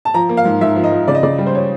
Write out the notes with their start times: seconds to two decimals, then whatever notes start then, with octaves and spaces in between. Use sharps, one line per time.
0.05 A5
0.14 F3 A#5
0.29 A#3
0.37 F5
0.45 G#2
0.61 G#2 E5
0.76 F3
0.84 D#5
0.92 F3
1.08 C#3 D5
1.15 D#5
1.23 C#3 D5
1.38 G3
1.47 C5
1.55 C#5